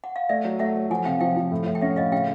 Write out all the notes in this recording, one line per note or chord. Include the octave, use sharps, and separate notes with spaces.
F#5
F5
A3 D5 E5
F#3
A3 E5 F#5
F#3
F3 F#5 G#5
C3 F5 G5
F3 F5 G5
F3
A2
A2
G5
C#4 E5 F#5
A2 D#5 F5
C#3 F5 G5